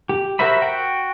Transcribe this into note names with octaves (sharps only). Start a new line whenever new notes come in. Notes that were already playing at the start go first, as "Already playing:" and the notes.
G4
F#4 A#4 C5 E5 B5
F#4 G5